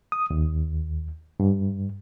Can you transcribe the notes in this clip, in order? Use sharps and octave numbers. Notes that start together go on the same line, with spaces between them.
D#6
D#2
G2